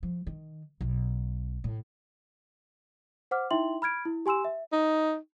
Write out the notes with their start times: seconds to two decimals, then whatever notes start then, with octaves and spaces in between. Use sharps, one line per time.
0.03 F3
0.27 D#3
0.81 B1
1.64 A2
3.31 C5 F#5 D6 F6
3.51 D#4 E4 E5 G5 C6 F#7
3.82 B5 F6 G#6 D7
4.05 E4
4.26 G4 G#5 C6 E6 E7
4.45 E5
4.72 D#4